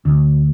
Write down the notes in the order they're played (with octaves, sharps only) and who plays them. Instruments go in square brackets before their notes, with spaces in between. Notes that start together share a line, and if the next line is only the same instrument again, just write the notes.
[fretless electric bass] D2